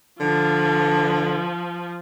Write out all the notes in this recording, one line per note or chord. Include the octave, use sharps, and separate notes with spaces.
D3 F3